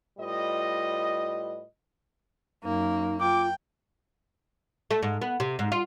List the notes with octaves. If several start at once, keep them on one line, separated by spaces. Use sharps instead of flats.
A2 G3 F4 B4 D#5
F#2 A#3 D#4
F4 G5 D6
A3
G#2
B3
C3
G#2
F4